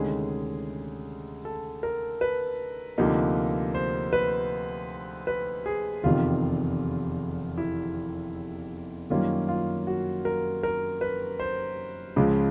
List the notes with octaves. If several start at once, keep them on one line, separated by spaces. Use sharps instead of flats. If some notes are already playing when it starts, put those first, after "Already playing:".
Already playing: D2 C3 D#3 G#3 C#4 G#4
A4
A#4
B4
D2 C3 F3 A#3 D#4
C5
B4
B4
G#4
F1 E2 C3 D#3 F4
E4
F#2 D#3 G3 A#3 C#4 F4
F4
F#4
A#4
A#4
B4
C5
C#2 C#3 F3 G#3